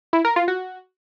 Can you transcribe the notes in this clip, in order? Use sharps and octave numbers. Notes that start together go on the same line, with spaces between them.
E4
A#4
F4
F#4